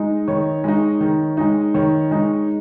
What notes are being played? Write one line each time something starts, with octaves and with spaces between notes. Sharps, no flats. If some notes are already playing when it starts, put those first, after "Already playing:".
Already playing: G#3 D#4
D#3 C#5
G#3 D#4
D#3
G#3 D#4
D#3 C#5
G#3 D#4